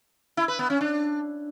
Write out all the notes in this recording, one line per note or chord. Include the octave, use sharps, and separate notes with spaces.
E4
B4
B3
C#4
D4